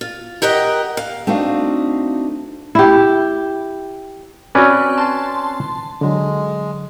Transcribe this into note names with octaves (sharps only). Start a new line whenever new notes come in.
F4
G4 A#4 D#5 F#5 G5
F5
A3 C4 D4 D#4 F#4 F5
E4 G4
C4 C#4 F#4 B4 D5
A5 C6
D3 F#3 G#3